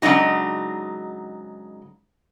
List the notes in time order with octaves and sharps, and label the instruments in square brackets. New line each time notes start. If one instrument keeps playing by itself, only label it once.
[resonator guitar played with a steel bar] G#2 C#3 F#3 D4 D#4 F#4